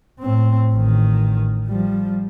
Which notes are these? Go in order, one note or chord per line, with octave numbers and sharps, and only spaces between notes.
A2 C4
A1 D#3
F3 G3